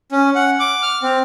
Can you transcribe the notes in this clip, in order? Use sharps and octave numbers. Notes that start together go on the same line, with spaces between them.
C#4
F#5
D6
F6
C4